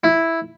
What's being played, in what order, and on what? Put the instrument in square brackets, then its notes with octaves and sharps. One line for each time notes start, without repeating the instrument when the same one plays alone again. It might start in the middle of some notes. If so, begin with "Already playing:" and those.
[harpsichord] E4